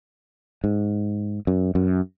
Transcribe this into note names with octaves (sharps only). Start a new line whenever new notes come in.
G#2
F#2
F#2